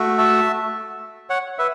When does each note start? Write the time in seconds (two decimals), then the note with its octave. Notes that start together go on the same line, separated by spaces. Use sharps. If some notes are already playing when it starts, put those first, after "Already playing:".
Already playing: A3 F#4
0.18 E5 A5
1.30 C#5 F#5
1.59 B4 E5